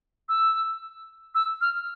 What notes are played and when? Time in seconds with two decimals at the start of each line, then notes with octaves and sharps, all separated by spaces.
0.29 E6
1.35 E6
1.61 F6